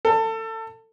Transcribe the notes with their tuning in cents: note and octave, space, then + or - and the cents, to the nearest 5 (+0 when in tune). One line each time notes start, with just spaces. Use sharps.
A4 +25